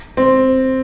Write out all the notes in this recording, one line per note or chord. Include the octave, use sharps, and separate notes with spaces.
C4